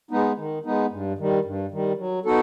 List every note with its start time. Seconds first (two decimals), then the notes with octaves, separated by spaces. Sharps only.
0.11 G#3 B3 D#4
0.37 D#3
0.65 G#3 B3 D#4
0.92 G2
1.18 D#3 G3
1.45 G2
1.71 D#3 G3
1.98 F#3
2.25 B3 D#4 F#4 A4